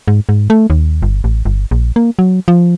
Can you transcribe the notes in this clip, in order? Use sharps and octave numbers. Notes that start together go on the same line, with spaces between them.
G#2
G#2
A3
D#2
G1
A1
G1
A#1
A#3
F#3
F3